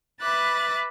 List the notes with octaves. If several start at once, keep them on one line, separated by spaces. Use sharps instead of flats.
B4 E5 B5 D6 F#6 A6